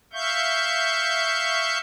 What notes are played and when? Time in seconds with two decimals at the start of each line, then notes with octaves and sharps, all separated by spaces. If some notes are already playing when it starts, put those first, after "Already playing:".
0.13 E5 F5 C#6 G6